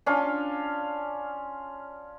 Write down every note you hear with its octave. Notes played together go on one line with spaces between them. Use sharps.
C#4 D4 F4 F5